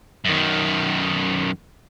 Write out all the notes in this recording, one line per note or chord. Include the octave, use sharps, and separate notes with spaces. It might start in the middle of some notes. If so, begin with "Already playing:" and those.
F#2 D#3